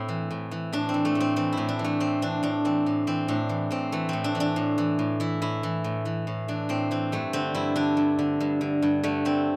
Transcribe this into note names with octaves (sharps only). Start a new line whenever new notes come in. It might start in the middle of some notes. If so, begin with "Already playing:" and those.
Already playing: A2 C4 E4
E3
A2
E3
A2 D4
C4
E3
A3
A2
C4
E3 C4
A2 E4
D4
E3
A3
A2 C4
E3 D4
A2 D4
E3 C4
A2
E3 C4
A2 D4
E3
A2 C4
E3 A3
A2 C4
D4
E3
D4
A2
E3
A2
E3 E4
A2 E4
E3
A2
E3
A2
E3 D4
A2 C4
E3 C4
G2 A3
D3 C4
G2 E4
D3 D4
G2
D3
G2
D3
G2
D3 A3
G2 C4